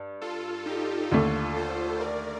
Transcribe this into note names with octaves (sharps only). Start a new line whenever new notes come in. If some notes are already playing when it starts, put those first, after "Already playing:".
Already playing: G2
F4 A4
D#4 G4
D#2 D3 A3 F4 A4
A4 C5
A#4 D5